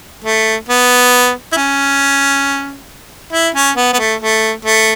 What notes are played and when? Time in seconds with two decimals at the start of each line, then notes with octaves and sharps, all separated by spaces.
0.25 A3
0.69 B3
1.52 E4
1.57 C#4
3.33 E4
3.55 C#4
3.77 B3
3.93 B3
3.99 A3
4.21 A3
4.65 A3